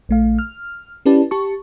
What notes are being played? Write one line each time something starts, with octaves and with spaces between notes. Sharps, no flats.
A#1 A3 F5
F6
C#4 E4 G4 B4 D5 A5
G4 A5 C#6